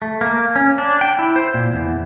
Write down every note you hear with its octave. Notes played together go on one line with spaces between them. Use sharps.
A3
A#3
C#4
D4
G5
E4
C5
A#2
E2